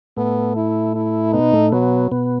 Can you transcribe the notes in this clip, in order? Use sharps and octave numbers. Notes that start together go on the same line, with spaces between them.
A2 A3 B3
E4
E4
B2 B3 D#4
A2 A3
B2 F#3 B3
B2 B3